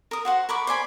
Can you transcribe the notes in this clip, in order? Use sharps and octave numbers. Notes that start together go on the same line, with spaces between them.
A#4 D#6
F#4 C5 F#5
A#4 B5 C#6 D6
C5 D5 G#5 B5